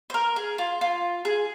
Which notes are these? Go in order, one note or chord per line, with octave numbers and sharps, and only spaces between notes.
C5
A#4
G#4
F4
F4
G#4